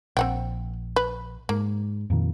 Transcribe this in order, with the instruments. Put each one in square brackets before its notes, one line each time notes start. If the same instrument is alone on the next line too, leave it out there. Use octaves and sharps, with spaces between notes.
[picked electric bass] A#1 [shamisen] C4 F#5 G5
[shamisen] B4
[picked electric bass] G#2 [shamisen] A#3
[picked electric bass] F2 A#2 D#3